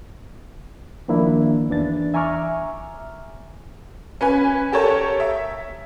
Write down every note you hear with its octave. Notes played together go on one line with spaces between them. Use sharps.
D#3 F3 A#3 D4 E4
E2 E3 D4 A6
E5 G#5 A#5 C#6 D6 F6
C#4 B4 G#5
G4 A4 A#4 C#5 A5
E5